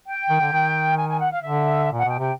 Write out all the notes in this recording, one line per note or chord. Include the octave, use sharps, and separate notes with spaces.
G5
D#3
D3
D#3
G#5
G#5
F#5
F5
D3 E5
A#2
F#5
B2 G5
C3 G5